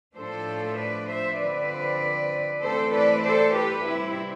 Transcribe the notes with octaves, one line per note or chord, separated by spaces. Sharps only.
A2 F3 A3 D4 A4 C5
B4 D5
C5 E5
D3 F3 C4 B4 D5
E3 A3 C4 A4 C5
B4 D5
A4 C5
G4 B4
C3 G3 C4 E4